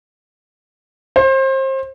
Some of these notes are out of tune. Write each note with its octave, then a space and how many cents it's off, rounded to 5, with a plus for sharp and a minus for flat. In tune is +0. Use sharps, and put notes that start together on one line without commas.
C5 +30